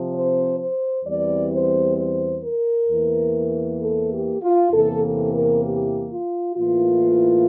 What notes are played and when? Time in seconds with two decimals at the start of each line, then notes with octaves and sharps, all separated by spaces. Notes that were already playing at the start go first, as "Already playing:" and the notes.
Already playing: C3 F3 C4
0.13 C5
0.59 C5
1.04 E2 E3 G3 C4 D5
1.51 C5
1.96 C5
2.43 A#4
2.88 E2 E3 A#3
3.80 A4
4.12 G4
4.42 F4
4.72 E2 C3 E3 A#3 A4
5.03 A4
5.34 A#4
5.64 G4
6.11 F4
6.55 A2 E3 A#3 F4